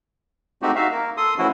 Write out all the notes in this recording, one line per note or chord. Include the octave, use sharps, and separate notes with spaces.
G#3 A3 C4 D#4 F#4 G4
D#4 F#4 E5 F5
A#3 A#4
A4 C6 D#6
E3 F3 A3 C#4 E4 F#4